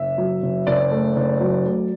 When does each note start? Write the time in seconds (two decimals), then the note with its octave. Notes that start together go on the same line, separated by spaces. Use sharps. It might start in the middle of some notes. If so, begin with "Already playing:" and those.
Already playing: F#1 E5
0.18 F#3
0.42 F#1
0.67 F#1 D5
0.91 A3
1.16 F#1
1.41 F#3
1.65 A3